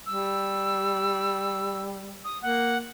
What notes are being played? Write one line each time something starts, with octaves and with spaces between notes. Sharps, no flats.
G3 E6
D#6
A#3 F#5